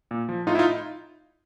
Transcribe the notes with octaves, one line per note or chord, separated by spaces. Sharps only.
A#2
F3
A2 D#4 F4
E4
D#4 F4